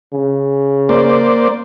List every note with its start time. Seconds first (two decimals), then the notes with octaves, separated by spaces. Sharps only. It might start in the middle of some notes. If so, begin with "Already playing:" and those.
0.13 C#3
0.89 A#3 C5 D5